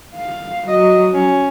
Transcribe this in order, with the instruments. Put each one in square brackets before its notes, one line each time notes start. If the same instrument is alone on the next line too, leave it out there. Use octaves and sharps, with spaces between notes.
[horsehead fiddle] F5
[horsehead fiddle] F#3 [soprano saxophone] D#5
[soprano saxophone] C#4